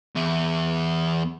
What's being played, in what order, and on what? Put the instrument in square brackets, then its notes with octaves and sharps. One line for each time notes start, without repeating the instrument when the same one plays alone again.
[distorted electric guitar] E2 E4